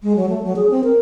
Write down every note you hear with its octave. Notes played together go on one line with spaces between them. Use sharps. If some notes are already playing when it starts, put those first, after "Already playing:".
G#3
F#3
A3
F#3
G#4
C4
A#4